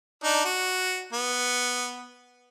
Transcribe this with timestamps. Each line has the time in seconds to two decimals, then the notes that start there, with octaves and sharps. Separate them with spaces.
0.24 D4 D#4
0.45 F#4
1.13 B3